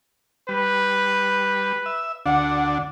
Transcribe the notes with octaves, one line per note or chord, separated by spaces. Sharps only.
G3 B4
E5
D2 D4 F#5